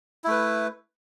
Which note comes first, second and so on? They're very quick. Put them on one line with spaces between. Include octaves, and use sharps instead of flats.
E4 A3 B4